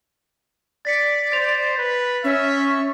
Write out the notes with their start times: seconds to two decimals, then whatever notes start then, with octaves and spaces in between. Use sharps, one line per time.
0.85 D5 A6 B6 C#7
1.32 C5 A6 F7
1.78 B4
2.24 C#4 E5 C#6